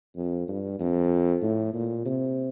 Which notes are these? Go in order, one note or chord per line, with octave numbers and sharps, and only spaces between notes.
F2
G2
F2
A2
A#2
C3